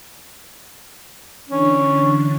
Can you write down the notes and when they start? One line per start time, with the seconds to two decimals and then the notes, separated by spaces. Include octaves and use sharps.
1.49 D3 E3 C#4 D4